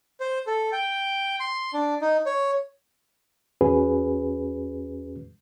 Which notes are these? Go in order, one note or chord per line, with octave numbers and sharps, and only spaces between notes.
C5
A4
G5
C6
D4
D#4
C#5
E2 C#4 F#4 G#4 B4